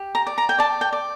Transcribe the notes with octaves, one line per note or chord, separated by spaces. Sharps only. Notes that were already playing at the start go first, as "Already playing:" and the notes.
Already playing: G4
A#5
D5
A#5
G5
D5 A5
G5
D5